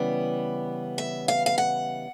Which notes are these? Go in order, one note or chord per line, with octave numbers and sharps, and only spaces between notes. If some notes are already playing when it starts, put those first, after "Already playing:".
Already playing: C#3 E3 G3 B3 D5
E5
F5
F5
F#5